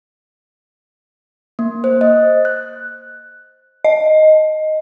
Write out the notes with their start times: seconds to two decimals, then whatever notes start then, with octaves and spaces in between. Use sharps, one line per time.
1.59 A#3
1.84 C5
2.01 D#5
2.45 F#6
3.84 D#5